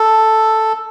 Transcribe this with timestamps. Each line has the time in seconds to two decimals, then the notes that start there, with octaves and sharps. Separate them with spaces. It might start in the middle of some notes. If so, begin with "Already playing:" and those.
Already playing: A4